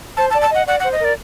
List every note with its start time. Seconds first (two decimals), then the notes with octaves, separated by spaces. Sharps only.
0.17 C5 A5
0.30 A5
0.34 D5
0.42 A5
0.50 D#5 F#5
0.67 D5 F#5
0.80 F#5
0.84 C5
0.93 D#5
1.00 A#4 D5